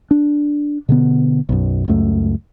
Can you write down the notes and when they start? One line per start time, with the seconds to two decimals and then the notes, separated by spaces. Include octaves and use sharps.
0.11 D4
0.89 B2 D3 B3
1.49 B1 F#2
1.88 C#2 F#2 A3